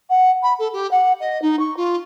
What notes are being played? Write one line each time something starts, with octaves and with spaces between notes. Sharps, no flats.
F#5
B5
A4
G4
F#5
D#5
D#4
C#6
F4